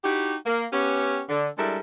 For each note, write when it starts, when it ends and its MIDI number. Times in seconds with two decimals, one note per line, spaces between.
0.04 0.36 63
0.04 0.36 64
0.04 0.36 66
0.04 0.36 67
0.46 0.65 58
0.72 1.22 59
0.72 1.22 61
0.72 1.22 67
1.29 1.48 50
1.58 1.80 55
1.58 1.80 56
1.58 1.80 62
1.58 1.80 64
1.58 1.80 69
1.58 1.80 70